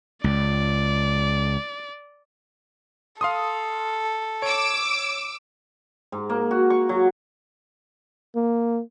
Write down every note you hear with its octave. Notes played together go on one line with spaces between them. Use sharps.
C#2 D5
A4 F5 C6 D#6
C#5 D6 E6 D7
G#2
A#3
F#4
C#6
F#3
A#3